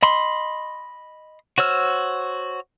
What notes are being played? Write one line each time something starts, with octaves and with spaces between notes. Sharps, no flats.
D#5 B5 C6
F#4 C5 C#5 E6 F6